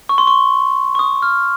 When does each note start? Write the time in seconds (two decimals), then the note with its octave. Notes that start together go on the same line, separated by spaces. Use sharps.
0.09 C#6
0.18 C6
0.27 C#6
0.95 C#6
0.99 D#6
1.22 F6